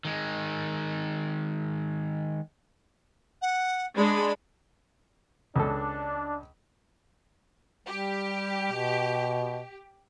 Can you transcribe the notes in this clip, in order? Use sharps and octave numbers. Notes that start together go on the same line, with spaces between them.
D#3 G#3
F#5
G#3 D4 B5
C#2 D4 A4
G3 G4
B2